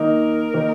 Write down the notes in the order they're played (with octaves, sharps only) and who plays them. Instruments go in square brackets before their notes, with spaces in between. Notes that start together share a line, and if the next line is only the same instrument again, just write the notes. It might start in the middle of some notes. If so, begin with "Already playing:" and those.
Already playing: [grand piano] D#3 A#3 D#4 [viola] A#4
[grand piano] D#3 A#3 D#4